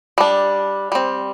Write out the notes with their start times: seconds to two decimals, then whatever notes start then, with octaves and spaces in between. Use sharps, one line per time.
0.18 G3 D4
0.92 G3 C4